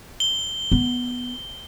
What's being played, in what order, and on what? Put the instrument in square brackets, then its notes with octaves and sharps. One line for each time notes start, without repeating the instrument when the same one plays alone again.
[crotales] G7
[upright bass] B3